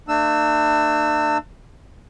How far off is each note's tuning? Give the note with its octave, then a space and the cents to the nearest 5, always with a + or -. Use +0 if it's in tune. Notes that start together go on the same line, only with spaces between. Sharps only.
A3 +40 D4 +40 E6 +0